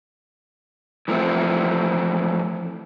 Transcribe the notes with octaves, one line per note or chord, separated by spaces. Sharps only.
E3 F3 A3 C4